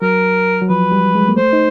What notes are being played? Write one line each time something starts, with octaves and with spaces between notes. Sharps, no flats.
F#3 A#4
F#3
F3 B4
G3
G#3
A#3
A3 C5
D#4